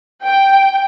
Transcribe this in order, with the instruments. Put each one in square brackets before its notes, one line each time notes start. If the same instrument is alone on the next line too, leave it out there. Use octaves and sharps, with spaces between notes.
[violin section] G5